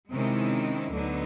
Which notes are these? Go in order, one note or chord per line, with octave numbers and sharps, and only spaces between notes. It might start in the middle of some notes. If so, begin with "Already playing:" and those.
C3 D#3 G#3 C#4 E4
D2 D3 F#3 B3 D#4